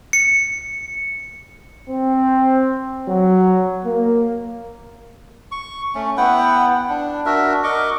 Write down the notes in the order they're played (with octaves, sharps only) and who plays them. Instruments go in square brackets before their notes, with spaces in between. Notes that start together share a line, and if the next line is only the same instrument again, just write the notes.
[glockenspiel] C#7
[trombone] C4
F#3
A#3
[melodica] C#6
A3 C#4
B3 E4 F#5 G5
D4
D4 F#4 A#4 E5
A#4 D#5 C#6 D6